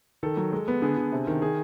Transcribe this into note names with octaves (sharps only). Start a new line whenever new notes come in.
D#3 A4
F#3
G#3
B3
D3 G#4
D3
C3
D#3
G#4